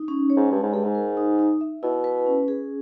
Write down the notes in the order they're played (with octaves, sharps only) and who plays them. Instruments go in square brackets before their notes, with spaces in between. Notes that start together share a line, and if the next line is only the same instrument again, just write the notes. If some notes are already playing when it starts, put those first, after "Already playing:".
Already playing: [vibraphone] D#4
C#4
C#5
[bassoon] G#2
[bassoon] G2 [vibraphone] G#3
[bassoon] G#2
[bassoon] G2 [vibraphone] G#4
[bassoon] G#2
[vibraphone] A#4
D#4
D#4
E5
[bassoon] B2 [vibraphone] E4
[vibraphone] B4
C#4
G#4